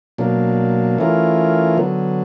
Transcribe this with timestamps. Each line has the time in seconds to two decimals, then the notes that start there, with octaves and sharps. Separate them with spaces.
0.18 B2 F#3 A#3 D4
0.98 E3 A3 C#4 F4 A#4
1.77 D3 F#3 B3